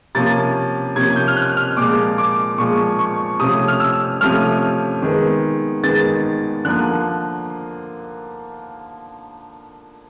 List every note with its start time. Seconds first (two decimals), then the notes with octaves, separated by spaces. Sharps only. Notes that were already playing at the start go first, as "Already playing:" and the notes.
0.15 C3 F3 A#3 C#4 A6
0.96 C3 F3 A#3 C#4 G#6
1.16 G6
1.28 F6
1.37 F#6
1.57 F6
1.77 A#2 F3 G#3 D6
2.18 D6
2.58 A#2 F3 G#3 C#6
2.99 C#6
3.40 C3 F3 A3 C#4 D#6
3.68 F6
3.80 E6
4.21 C3 F3 A3 C#4 F6
5.02 D#3 G#3 B3
5.84 D#3 G#3 B3 A6
6.65 D3 F3 A#3 F#6